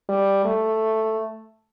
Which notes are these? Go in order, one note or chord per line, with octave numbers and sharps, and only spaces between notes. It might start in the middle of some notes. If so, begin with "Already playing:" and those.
G3
A3